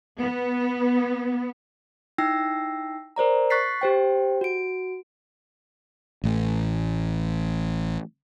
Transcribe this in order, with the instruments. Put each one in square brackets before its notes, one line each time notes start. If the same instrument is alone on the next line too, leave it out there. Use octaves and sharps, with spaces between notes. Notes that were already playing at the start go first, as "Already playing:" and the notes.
[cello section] B3
[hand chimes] D#4 E4 G5 E6 A#6 C7
A#4 C5 D5 A#5
C#6 F#6 A6 B6 C7
G4 C5 G5
F#4 D7
[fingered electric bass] A1 A2